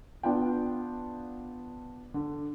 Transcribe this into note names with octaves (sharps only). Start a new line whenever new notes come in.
B3 D4 F4 G5
D3